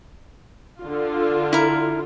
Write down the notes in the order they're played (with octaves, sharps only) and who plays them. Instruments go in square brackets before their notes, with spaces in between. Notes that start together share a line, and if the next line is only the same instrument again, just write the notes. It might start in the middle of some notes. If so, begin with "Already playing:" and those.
[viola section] D3 F4
[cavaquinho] E4 A#4